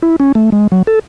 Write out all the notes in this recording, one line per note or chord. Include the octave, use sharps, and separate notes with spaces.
E4
C#4
A3
G#3
F#3
A4